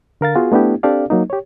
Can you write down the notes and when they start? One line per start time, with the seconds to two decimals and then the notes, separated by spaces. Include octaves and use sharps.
0.21 D3 A#4 F5 A6
0.35 B3 F4 F#4 G#4
0.52 A3 B3 D4 E4 G4
0.83 C4 D4 G4 A4 D5 F5
1.10 F#3 A#3 D#4
1.30 G4 C#5